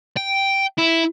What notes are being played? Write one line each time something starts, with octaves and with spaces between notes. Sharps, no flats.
G5
E4